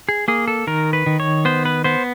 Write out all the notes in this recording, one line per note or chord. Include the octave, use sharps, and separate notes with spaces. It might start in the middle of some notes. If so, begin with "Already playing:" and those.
G#4
A#3 G#4
A4
D#3 A#4
B4
D#3
C#5
B3 C5
B4
B3 C5